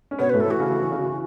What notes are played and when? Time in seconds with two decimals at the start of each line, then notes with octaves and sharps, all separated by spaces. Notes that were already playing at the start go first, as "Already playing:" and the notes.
0.11 C#4
0.19 B2 B3 C#5
0.29 B4
0.33 A2 A3
0.40 A4
0.47 E3 F#4
0.60 C#3
0.70 E3
0.80 E3
0.92 C#3
1.02 E3